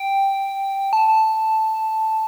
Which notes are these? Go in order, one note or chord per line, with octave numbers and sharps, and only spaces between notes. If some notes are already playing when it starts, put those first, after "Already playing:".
Already playing: G5
A5